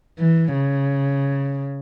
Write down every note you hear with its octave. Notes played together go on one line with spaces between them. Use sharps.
E3
C#3